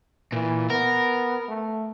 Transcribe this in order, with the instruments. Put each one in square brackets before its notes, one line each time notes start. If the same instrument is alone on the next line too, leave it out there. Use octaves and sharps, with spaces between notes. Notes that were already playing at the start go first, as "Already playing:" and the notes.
[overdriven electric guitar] A#2 [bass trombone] E3
[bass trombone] B3 [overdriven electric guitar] A#4
[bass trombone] A3